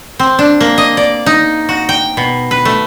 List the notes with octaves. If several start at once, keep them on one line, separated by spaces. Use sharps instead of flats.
C4
D4
A#3
D#5
D5
D#4
F#4
G5
B2
B4
A3